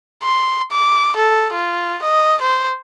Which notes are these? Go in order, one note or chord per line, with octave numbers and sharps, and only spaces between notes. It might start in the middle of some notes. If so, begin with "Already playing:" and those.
C6
D6
A4
F4
D#5
C5